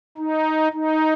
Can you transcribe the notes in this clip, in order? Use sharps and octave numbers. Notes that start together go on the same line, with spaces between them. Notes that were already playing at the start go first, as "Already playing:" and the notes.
D#4
D#4